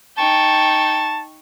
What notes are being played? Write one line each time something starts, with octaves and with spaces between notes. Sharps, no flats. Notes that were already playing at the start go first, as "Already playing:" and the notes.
D#4 G5 A5 C#6